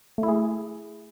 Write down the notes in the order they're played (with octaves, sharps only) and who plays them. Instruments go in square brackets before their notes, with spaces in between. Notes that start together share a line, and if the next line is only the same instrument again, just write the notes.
[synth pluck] A3
E4
G#4